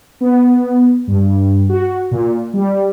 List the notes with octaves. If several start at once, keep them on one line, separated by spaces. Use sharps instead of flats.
B3
G2
F#4
A#2
G3